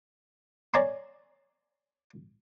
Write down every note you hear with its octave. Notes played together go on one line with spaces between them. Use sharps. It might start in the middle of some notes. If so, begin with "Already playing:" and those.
C#5 D5 G#5 A#5 C6